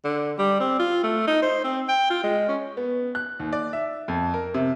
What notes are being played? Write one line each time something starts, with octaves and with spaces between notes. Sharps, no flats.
D3
G3
C4
F4
A3
D#4
C5
C4
G5
F4
G#3
C#4
B3
F#6
D#2
D5
E5
F2
A#4
C3